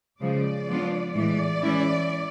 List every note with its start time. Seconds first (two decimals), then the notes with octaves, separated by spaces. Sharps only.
0.22 C#3 F3 G#3 D5
0.68 F3 G#3 B3 D4 F4
1.15 A2 E3 G#3 D5
1.62 E3 G#3 C#4 E4